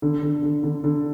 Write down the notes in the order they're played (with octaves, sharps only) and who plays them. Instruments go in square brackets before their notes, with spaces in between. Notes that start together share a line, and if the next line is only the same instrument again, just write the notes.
[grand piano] D3
D3
D3
D3
D3